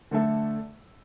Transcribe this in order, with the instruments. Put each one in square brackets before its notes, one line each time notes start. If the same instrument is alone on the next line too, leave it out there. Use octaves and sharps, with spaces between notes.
[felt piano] D3 A3 D4 A4 E5